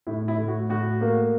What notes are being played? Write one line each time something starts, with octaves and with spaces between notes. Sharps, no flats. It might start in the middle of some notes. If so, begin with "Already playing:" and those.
A2 E4
E4
A2
F#4
A2 F#4
A#3